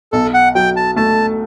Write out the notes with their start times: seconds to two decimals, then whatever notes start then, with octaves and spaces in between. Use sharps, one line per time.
0.12 B1 A4
0.34 F#5
0.55 F#3 G5
0.76 A5
0.96 A3 A5